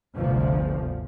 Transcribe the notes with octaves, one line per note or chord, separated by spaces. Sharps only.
G1 D2 C3 F3